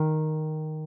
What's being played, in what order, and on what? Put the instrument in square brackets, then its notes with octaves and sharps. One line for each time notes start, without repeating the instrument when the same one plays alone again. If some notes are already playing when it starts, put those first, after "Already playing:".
Already playing: [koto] D#3